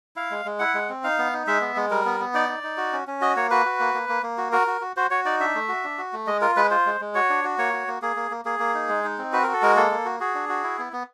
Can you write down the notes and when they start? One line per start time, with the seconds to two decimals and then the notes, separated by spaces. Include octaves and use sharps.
0.16 E4 F5
0.31 G#3
0.45 G#3
0.59 E4 F#5
0.74 G#3
0.89 C4
1.04 D#4 F5
1.18 B3
1.33 D#4
1.47 G#3 E5
1.61 B3
1.76 G#3
1.91 G3 A#4
2.06 B3
2.20 B3
2.34 D#4 D5
2.49 D#4
2.63 D#4
2.77 F#4
2.93 C#4
3.07 C#4
3.21 F#4 D#5
3.36 A#3 C#5
3.50 F#4 B4
3.65 F#4
3.80 A#3
3.94 A#3
4.09 A#3
4.23 A#3
4.38 F#4
4.52 F#4 A#4
4.67 F#4
4.81 F#4
4.96 F#4 C5
5.10 F#4 C#5
5.25 D#4 D5
5.40 D4 E5
5.55 A3
5.68 F#4
5.84 D4
5.98 F#4
6.13 A3
6.27 G#3 D#5
6.41 F4 A#4
6.56 G#3 B4
6.71 F4 C5
6.86 G#3
7.01 G#3
7.15 F#4 C#5
7.30 D4
7.44 F#4
7.58 A#3 C#5
7.73 F#4
7.88 A#3
8.02 A#3 G#4
8.16 A#3
8.31 A#3
8.45 A#3 G#4
8.60 A#3
8.74 D#4
8.89 G#3
9.04 D#4
9.18 C4
9.33 F#4 B4
9.43 F#4 A#4
9.53 A4
9.62 G#3 A#4
9.76 A#3 A4
9.91 A#3
10.05 F#4
10.20 F#4 G#4
10.35 D4
10.49 F#4
10.64 E4
10.79 B3
10.93 B3